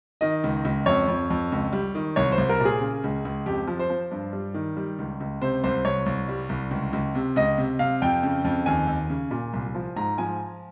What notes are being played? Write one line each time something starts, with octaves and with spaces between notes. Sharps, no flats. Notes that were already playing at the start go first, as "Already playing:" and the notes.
D#3 D#5
C#2
C#2
F2 C#5
F2
F2
C#2
G3
D#3
C2 C#5
C5
C2
A#4
A#2
G#4
C#3
C#2
C#2
F2 G4
F3
C5
F3
G2
G3
D#3
G3
C#2
C#2
C3 C5
C2 C5
C2 C#5
C2
G3
C2
C#2
C#2
C3
C#2 D#5
C3
C3 F5
F2 G5
C#3
F2
D#2 G#5
D#2
C#3
A#2
C2
F3
G#2 A#5
F3 G#5